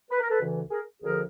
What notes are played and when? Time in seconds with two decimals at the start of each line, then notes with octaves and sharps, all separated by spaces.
0.10 B4
0.20 A#4
0.30 A4 B4
0.40 D2 C#3 E3
0.71 G#4 A#4
1.01 D2 D3 F3 G#4 A#4